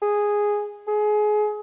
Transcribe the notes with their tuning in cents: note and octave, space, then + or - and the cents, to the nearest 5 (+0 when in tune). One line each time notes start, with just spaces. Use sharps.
G#4 -5
G#4 +25